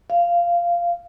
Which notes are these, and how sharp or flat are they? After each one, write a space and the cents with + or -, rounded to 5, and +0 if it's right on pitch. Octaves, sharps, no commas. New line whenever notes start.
F5 -15